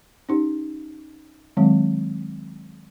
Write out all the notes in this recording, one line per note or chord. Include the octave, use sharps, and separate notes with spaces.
C#4 D#4 G4
D#3 F#3 G#3 C4